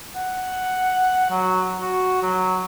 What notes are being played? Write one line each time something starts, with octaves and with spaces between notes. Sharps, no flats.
F#5
F#3
F#4
F#3